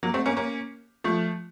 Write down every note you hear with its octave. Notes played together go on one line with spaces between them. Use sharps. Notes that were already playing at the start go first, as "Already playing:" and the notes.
F#3 A#3
A3 C4
A#3 C#4
A#3 C#4
F3 A3